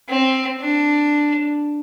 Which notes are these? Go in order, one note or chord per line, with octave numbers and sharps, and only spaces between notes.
C4
D4